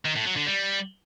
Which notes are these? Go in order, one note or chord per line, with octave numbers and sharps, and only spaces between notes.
D#3
A2
F#3
D3
G3